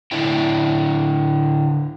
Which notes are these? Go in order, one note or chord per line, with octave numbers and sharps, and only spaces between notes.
D3 D4 E4 G5